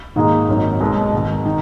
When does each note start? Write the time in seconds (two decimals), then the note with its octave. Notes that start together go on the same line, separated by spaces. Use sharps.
0.16 G#2 D#3 A#3 D#4 G#4
0.48 G#1 F#2 D#3
0.81 B1 B2 G#3
1.12 G#1 G#2 D#3
1.45 D#3